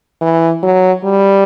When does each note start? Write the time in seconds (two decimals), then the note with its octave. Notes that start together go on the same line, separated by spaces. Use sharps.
0.22 E3
0.63 F#3
1.05 G3